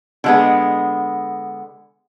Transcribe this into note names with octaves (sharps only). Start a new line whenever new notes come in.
D3 G#3 B3